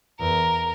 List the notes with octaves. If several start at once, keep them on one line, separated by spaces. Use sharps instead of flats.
E2 A#4